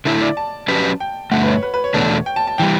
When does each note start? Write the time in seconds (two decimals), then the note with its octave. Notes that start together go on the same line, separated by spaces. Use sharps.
0.05 D3 A3 E4
0.22 D5
0.37 A5
0.68 F#3 C#4 G4 B4
1.00 G5
1.32 G2 D3 A3 F#5
1.43 B4
1.48 C#5
1.63 B4
1.74 B4
1.84 C#5
1.94 E2 B2 A3 D4
2.26 G5
2.36 A5
2.47 A5
2.58 E3 G3 G5